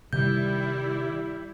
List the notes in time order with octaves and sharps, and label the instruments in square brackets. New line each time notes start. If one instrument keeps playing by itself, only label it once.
[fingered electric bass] C3 D#3 [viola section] G3 E4 [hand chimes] G6